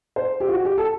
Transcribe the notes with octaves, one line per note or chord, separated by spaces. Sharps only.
C5
G4
F4
F#4
G4
A4